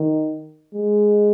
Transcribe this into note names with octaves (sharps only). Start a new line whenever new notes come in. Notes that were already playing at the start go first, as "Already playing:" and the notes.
Already playing: D#3
G#3